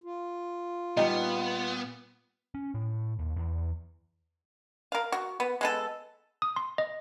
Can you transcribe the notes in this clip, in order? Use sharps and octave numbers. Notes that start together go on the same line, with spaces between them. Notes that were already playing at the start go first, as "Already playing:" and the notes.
F4
A#2 G3 B3 D#4
C#4
A2
D#2
E2
A#4 F5
F#4
B3
G#3 B3 A4
D#6
C6
D#5